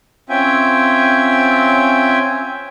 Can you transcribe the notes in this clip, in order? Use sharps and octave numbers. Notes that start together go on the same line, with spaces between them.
C4 C#4 F4 E5 G5 G#5